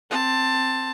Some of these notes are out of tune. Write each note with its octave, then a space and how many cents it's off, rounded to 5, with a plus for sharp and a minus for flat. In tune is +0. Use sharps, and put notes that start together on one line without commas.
C4 +0 A5 +15